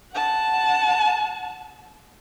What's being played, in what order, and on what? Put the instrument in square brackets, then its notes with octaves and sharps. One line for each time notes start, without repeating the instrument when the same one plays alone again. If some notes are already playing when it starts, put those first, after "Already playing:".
[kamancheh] F#5 A5